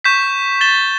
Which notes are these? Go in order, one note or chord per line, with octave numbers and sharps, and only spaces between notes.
C#6 G6 B6 E7
A6 E7 G7